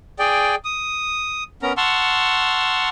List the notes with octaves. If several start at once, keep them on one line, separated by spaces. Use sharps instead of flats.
G#4 D5 G5
D#6
B3 C#4 A#4 A#5
F#5 A5 C6 C#6 E6 F6